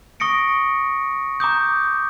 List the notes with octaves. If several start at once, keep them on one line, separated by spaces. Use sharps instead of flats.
C#6 D#6 A#6 C#7 D7
A#5 D6 D#6 G6